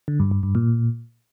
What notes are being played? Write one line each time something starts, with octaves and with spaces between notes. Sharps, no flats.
D3
G2
G2
G2
A#2